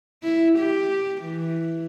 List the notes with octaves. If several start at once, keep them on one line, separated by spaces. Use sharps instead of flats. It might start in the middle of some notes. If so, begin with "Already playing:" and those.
E4
G4
E3